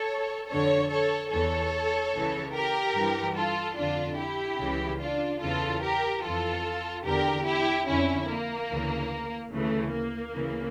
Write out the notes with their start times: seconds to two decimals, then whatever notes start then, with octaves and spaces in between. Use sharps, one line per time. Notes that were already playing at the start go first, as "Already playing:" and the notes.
Already playing: A4 C#5
0.49 F2 D3 A4 C#5
0.90 A4 C#5
1.31 E2 E3 A4 C#5
2.13 C#2 C#3 E3
2.54 G4 A#4
2.95 G2 E3
3.36 F4 A4
3.77 F2 D3 D4 F4
4.18 E4 G4
4.59 C#2 C#3 E3
5.00 D4 F4
5.41 E2 C#3 E3 F4 A4
5.82 G4 A#4
6.23 F2 E3 F4 A4
7.05 E2 D3 G4 A#4
7.46 E4 G4
7.87 F2 D3 C#4 E4
8.28 A#3
8.70 D2 C#3 E3
9.52 D2 C#3 E3 A3
9.92 A#3
10.34 D2 C#3 E3